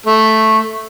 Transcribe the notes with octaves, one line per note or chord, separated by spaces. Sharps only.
A3